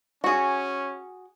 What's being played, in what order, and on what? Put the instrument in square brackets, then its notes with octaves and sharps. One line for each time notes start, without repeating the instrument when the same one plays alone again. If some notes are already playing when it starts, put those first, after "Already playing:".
[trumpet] C#4 [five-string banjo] F#4 G#4